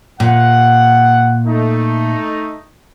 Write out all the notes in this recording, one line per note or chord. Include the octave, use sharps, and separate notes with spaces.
A#2 F#5
A3 D#4